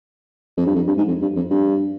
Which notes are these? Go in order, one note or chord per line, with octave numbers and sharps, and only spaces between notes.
F2
G2
F2
G2
G#2
F2
G2
F2
G2